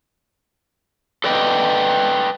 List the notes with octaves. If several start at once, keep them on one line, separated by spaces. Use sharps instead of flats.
A4 B4 D5 D#5 G5